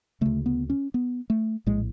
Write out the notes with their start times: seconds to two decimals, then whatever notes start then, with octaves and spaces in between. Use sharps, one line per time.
0.21 D2 C#3 A3
0.46 B3
0.70 C#4
0.94 B3
1.30 A3
1.67 A#1 A2 G#3